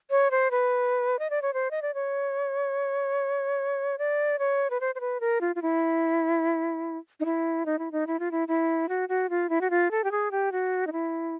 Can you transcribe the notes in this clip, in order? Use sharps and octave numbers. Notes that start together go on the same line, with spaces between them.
C#5
C5
B4
D#5
D5
C#5
C5
D#5
D5
C#5
D5
C#5
B4
C5
C5
B4
A#4
F4
F4
E4
D#4
E4
D#4
E4
D#4
E4
F4
E4
E4
F#4
F#4
F4
E4
F#4
F4
A4
G4
G#4
G4
F#4
D#4
E4